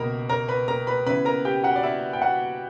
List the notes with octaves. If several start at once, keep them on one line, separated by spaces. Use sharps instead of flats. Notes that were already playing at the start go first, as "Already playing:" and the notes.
Already playing: C#2 B2 A#3 A#4 A#5 B5
A#4 A#5
B4 B5
A#4 A#5
B4 B5
C#3 E3 B3 E4 B4 B5
A#4 A#5
G4 G5
F#4 F#5
D5
E4 E5
G5
F#4 F#5